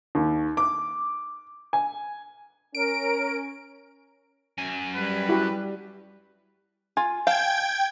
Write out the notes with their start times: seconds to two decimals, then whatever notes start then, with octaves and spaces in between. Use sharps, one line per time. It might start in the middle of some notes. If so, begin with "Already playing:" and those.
0.15 D#2
0.57 D6
1.73 G#5
2.75 C#4 A#4 D7
4.58 F#2 G#5
4.95 G3 B4
5.29 E4 F#4 G4
6.97 F4 G#5
7.27 F5 G5 A5 G#6